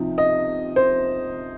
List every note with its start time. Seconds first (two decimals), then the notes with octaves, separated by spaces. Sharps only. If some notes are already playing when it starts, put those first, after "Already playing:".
Already playing: C3 F3 D#4
0.18 D#5
0.76 C5